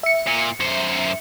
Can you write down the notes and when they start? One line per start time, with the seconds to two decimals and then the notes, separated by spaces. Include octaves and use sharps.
0.03 E5 C#7
0.27 A#2
0.60 F#2 C5